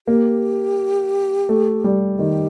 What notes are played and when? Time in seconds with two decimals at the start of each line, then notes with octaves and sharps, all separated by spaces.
0.07 A#3 G4
1.49 A3
1.84 G3
2.19 D#3 G4